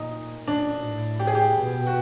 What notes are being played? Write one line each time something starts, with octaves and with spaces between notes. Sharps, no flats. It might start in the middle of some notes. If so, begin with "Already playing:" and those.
Already playing: A#2 D#4
A#2 D4
A2
G4
G#4
G4
B2
F#4